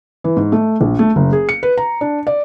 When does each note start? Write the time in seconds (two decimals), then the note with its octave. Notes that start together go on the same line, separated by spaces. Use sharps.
0.24 E3
0.36 G#2
0.52 A3
0.81 A#1
0.99 A3
1.16 F#1
1.33 G#4
1.49 C#7
1.63 B4
1.78 A#5
2.01 D4
2.27 D5